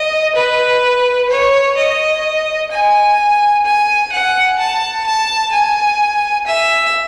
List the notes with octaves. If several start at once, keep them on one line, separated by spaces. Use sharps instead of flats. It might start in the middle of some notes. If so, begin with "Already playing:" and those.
Already playing: D#5
B4
C#5
D#5
G#5
G#5
F#5
A5
A5
G#5
E5